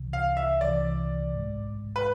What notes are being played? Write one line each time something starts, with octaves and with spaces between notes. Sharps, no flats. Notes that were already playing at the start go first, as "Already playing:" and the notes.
Already playing: C2 C3 E3
F5
E5
C2 C3 E3 D5
A1 G#2 G#3
B4